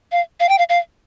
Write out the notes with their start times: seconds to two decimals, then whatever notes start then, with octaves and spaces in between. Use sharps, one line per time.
0.12 F5
0.40 F5
0.49 G5
0.59 F5
0.69 F5